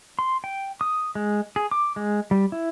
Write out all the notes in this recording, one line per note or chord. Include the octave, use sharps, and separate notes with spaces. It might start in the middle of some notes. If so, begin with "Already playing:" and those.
C6
G5
D#6
G#3
G#4
D6
G#3
G3
E4